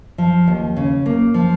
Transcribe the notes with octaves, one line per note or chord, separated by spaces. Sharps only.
F3
D#2
C#3
A#3
F3